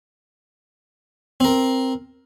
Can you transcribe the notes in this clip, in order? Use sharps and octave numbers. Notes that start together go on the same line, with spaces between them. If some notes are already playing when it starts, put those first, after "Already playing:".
C4 A#4